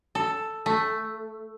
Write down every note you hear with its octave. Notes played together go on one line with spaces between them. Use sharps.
A4
A3